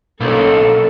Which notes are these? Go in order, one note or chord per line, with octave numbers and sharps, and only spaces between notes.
B1 A#3 C#4 A4